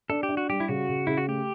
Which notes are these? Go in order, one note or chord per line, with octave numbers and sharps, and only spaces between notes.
D4 A4
G4
D4
F#4
G3 G4
E4
C#3 F#4
C#3
C#3 E4
F#4
A3 G4